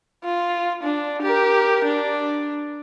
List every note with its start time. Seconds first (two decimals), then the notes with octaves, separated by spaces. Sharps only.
0.24 F4
0.83 D4
1.22 G4 A#4
1.84 D4